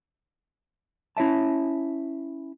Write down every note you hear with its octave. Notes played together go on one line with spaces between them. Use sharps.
C#4 E4 C#5 E5 A5